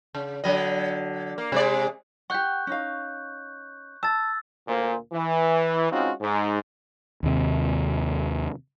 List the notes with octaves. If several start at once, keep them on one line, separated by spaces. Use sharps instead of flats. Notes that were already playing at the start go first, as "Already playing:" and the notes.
C#3
D3 F#3 D#5
A#3
C3 G#3 D5
G4 F#5 C#6 F#6 G6
C#4 D#4 F5
A5 E6 A6
D2 A#2 C5
E3
G#3 C4 C#4 D#4 F4 F#4
G#2
D#2 C3